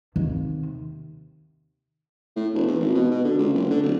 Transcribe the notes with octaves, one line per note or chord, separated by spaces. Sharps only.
D#2 C3
A2
E1
E2
G#1
B2
B2
D3
C#2
F#1
D3
D1